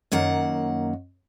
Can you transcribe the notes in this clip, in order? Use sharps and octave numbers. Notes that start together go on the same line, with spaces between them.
F#2 D#3 A#3 F#5